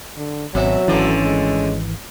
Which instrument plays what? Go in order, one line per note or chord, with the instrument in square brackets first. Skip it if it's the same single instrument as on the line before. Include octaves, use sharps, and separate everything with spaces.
[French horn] D3
[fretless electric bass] G#1 [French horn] B2 [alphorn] F#3 [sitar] C4 E5
[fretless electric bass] G#1 E3 [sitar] D3 A3 C4 [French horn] C#4
[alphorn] G#3